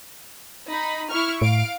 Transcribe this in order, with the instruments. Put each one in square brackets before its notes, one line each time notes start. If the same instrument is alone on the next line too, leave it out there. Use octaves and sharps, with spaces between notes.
[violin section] D#4 B5
E4 C#6 F6
[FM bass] A2 [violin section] F5 D7